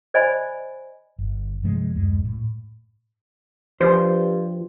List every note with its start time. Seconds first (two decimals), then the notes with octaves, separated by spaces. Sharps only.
0.14 C5 D5 D#5 G#5 B5
1.19 G1
1.63 G2 C3 F3 G#3
1.95 D1 F#2 G#3
2.25 A2
3.81 G2 F3 C5